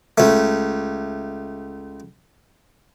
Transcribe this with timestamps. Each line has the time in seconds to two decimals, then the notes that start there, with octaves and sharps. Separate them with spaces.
0.18 C#2 A3